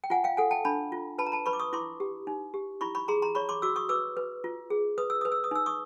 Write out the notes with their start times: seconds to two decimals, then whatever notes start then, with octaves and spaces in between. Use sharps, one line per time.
0.04 G5
0.10 F4 F#5 G#5
0.24 F5 G5
0.37 A4 F#5 G#5
0.51 G5 A5
0.65 D4 A5 B5
0.92 F4
1.18 B4 A5 B5
1.27 A#5
1.32 A5 B5
1.46 B4 B5 C#6
1.53 D6
1.59 C#6 D#6
1.73 E4 C6 D6
2.00 G4
2.27 D#4
2.54 G4
2.81 E4 B5 C#6
2.95 B5 C#6
3.08 G#4 A#5 C6
3.22 A#5 C6
3.35 C#5 B5 C#6
3.49 C6 D6
3.62 F#4 D6 E6
3.76 C#6 D#6
3.89 B4 D6 E6
4.17 B4
4.44 F4
4.70 G#4
4.98 B4 D#6
5.10 E6
5.21 B4 D#6
5.32 E6
5.44 D#6
5.51 D#4 E6
5.66 C#6 D#6